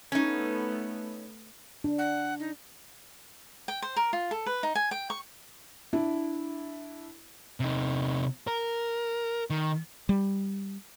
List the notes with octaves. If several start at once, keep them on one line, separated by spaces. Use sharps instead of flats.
A3 B3 C#4 D#4
D4
F#5
D#4
G5
C5
A#4
F4
A4
B4
D#4
G#5
G5
C#6
D4 E4
C3 D#4
A#4
D#3
G3